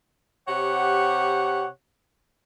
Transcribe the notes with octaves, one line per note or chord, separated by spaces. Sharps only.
C3 G4 C#5 F#5